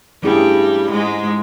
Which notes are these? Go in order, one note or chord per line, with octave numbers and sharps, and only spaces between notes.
G2 E3 G3 A3 C#4 E4 G#4
G#2 G#3